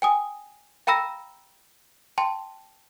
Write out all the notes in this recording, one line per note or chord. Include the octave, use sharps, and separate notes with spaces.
G5 G#5 D#6
F5 G5 A#5 B5 E6 A#6
G5 A5 C6